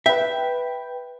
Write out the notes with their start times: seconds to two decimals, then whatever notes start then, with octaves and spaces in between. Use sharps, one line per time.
0.06 B4 E5 G5